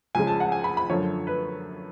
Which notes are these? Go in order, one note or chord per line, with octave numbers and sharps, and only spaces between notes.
C#2 C#3 F3 G#3 G#5
A5
F#5
G#5
B5
B5
F#2 D3 F3 C#5
B4